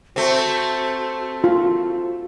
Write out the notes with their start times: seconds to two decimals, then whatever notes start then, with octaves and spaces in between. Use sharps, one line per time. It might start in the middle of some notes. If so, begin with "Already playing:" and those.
0.16 A3 C4 F#4
1.44 F4